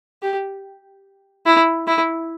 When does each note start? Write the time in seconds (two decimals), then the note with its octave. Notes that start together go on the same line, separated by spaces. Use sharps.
0.22 G4
1.46 E4
1.87 E4